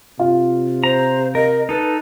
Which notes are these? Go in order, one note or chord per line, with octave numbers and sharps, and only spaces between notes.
C3 F4
C5 A#5
A#4 D#5
D#4 A4 B4